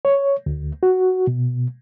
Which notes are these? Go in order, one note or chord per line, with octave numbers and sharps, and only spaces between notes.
C#5
D2
F#4
B2